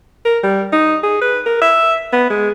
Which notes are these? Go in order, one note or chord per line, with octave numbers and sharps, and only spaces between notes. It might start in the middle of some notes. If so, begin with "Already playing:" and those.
A#4
G3
D#4
G#4
B4
A#4
E5
B3
G#3